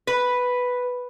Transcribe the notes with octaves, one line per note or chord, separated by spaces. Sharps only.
B4